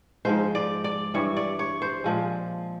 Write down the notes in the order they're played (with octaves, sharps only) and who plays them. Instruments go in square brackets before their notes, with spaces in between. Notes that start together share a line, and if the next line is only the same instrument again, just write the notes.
[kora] G#2 F3 G#3 C5
D5
D5
G2 E3 G3 C#5
D5
C#5
C5
A#2 F3 G#3